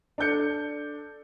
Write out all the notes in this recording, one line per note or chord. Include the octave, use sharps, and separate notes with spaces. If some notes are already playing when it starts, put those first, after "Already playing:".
D4 A4 G6 C#7